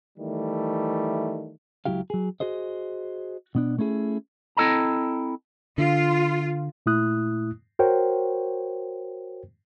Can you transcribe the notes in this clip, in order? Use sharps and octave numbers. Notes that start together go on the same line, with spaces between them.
D#3 E3 G3 A3
C#2 C3 F#3 E4 G4 F5
F#3 G#4
F#4 G#4 C5 D#5
B2 B3 D4
A3 C#4 E4 G#4
C4 E4 A4 D#5 A5 A#5
D3 F4
A#2 A3 E4 D#6 F#6
F#4 A#4 C5 C#5 G5